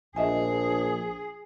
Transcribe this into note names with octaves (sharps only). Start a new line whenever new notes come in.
A#1 G#4 D#5 E5 G#5